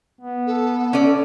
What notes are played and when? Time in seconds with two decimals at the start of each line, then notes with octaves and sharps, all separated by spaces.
0.21 B3
0.47 A4
0.93 C#4 D5